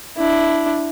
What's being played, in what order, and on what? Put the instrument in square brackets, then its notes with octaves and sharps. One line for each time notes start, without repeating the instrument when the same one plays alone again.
[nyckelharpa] D4 E4